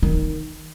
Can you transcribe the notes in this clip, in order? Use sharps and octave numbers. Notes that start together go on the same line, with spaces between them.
D#3